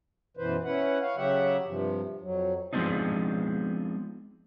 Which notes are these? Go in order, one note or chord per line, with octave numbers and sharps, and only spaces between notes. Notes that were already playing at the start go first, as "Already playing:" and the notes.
F#2 B2 E3 B4 C5
C#4 E4 B4 F#5
C#5 F5
C#3 F#3 G4 E5 F#5
G2 C3 F3
F2 F#3
F3 G#3 B3 C4 D4 D#4